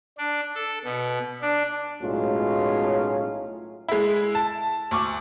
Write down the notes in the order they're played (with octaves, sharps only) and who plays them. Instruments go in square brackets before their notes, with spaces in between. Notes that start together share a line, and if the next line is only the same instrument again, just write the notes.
[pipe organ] D4
A4
B2
D4
[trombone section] B1 A2 F#3 G#3 C#4 F4
[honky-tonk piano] G#3 E4
A5
D2 C#6 D6